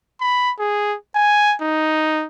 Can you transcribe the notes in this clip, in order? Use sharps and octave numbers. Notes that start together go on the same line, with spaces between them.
B5
G#4
G#5
D#4